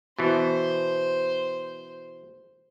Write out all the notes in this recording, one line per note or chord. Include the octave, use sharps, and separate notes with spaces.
B2 E3 C5